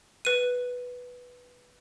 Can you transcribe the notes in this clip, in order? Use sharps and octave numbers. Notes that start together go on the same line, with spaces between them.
B4 D#7